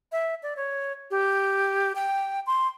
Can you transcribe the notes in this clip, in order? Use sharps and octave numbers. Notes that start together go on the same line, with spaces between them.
E5
D5
C#5
G4
G5
C6